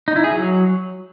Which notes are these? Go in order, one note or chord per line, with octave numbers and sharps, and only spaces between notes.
D#4
E4
G#4
F#3